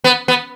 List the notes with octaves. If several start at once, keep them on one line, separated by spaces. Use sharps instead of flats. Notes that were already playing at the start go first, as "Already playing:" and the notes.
B3
B3